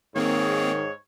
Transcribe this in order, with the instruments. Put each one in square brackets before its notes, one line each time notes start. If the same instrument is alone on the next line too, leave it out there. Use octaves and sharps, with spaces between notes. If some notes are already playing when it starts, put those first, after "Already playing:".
[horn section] G#2 C#5 [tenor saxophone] D#3 [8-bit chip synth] A#3 C4 G#4